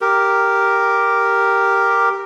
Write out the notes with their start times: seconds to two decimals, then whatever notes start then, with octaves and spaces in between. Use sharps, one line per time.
0.01 G4 A#4